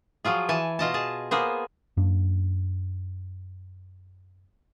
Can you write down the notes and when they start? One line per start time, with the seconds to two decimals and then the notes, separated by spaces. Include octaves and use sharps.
0.25 F3 F#3 F4 G#4
0.49 E3 G#5 A5
0.79 B2 F4 D#5 A5
0.94 G#4 A5
1.31 A#3 B3 G#4 C5
1.97 F#2 A#3 D4